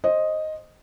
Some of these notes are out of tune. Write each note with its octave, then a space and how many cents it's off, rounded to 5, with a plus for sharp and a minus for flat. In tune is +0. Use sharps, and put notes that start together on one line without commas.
C5 +15 D#5 +0